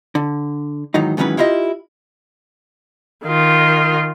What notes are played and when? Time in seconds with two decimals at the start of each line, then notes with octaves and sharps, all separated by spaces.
0.15 D3
0.94 G#2 D#3 E3 F#3 D#4
1.17 G#2 D#3 E3 F#3 C#4 B4
1.38 E4 F4 G4 D#5
3.25 D#3 F4